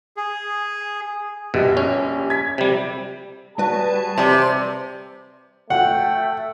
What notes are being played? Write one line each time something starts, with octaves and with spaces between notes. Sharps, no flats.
G#4
A#1 B2 G3 G4
C#4
G#6 B6
C3 G3
G3 F#4 G#4 B4 C#5 A5
C3 D5 C6
A3 F#5 G5